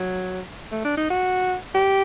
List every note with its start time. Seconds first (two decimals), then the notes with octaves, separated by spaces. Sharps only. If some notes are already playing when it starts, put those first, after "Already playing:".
Already playing: F#3
0.72 A3
0.85 D4
0.98 D#4
1.10 F#4
1.75 G4